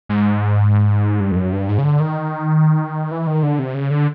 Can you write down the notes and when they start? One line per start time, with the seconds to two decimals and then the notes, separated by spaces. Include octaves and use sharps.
0.09 G#2
1.20 G2
1.32 F2
1.36 F#2
1.52 G2
1.69 G#2
1.78 C#3
1.84 D3
2.00 D#3
3.11 E3
3.27 D#3
3.43 D3
3.59 C3
3.74 C#3
3.91 D3